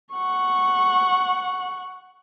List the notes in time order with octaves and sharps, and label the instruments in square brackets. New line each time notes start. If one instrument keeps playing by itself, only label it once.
[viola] F#5 C#6